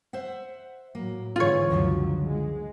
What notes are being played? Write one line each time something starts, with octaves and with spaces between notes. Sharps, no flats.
C5 E5 F#5
A2 F#3 A#3
G#2 D3 E3 F4 G#4 C#5
C#2 F#2 D3 F3 F#3
G#3